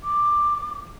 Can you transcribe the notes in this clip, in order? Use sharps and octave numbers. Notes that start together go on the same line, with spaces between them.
D6